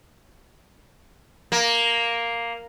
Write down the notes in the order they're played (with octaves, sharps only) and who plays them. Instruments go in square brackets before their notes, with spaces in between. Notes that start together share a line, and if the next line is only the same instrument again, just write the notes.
[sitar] A#3